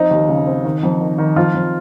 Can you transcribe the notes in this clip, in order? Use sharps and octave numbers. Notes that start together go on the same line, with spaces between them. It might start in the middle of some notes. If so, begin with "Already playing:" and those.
Already playing: F2 C4 D#4
D#2
C#3
C4
D#3
F2
D#3
D#3
F2 F4
F2